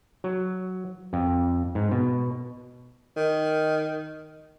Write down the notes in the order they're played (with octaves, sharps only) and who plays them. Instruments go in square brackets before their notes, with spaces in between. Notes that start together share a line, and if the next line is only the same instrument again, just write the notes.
[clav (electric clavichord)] F#3
F2
G#2
B2
[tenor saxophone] D#3